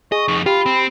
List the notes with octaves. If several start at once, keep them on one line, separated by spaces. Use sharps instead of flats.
G#4 D#5 C#6
F2 D#4
F4 G4 B5
C4